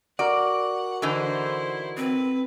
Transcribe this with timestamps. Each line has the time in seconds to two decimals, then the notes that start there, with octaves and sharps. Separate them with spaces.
0.19 F#4 A#4 D5 F#5
1.02 D3 E3 D#4 E4 C5
1.97 C4 B4